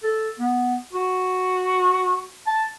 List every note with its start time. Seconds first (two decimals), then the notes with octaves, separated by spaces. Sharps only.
0.04 A4
0.40 B3
0.93 F#4
2.47 A5